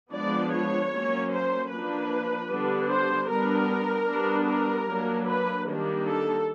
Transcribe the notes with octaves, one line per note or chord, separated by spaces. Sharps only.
F3 G#3 B3 D4 D5
C#5
F#3 A#3 C#4
C5
F3 A#3 D4 B4
D3 G3 B3 D4
C5
G3 B3 D4 A#4
G3 B3 D4
A#4
F#3 A#3 D4
B4
D#3 G3 A#3 D4
A4